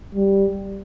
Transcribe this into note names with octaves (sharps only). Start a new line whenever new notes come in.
G3